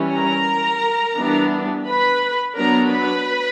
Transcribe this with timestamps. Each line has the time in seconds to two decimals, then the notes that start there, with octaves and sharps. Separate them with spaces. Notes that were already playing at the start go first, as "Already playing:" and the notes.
Already playing: E3 G3 C#4
0.14 A#4 A#5
1.18 E3 G3 B3 D4
1.87 B4 B5
2.57 F#3 B3 D4 A#4 A#5
2.91 B4 B5